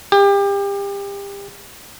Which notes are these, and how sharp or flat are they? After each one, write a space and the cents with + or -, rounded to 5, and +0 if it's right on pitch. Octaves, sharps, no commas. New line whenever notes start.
G4 +30